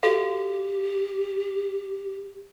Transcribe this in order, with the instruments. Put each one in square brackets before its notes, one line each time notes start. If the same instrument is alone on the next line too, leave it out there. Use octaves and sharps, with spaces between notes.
[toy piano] F#4 A4 F5 [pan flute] G4